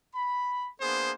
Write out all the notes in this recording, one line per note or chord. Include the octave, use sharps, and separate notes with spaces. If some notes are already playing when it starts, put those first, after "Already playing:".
B5
A#3 B3 D4 G#4 C5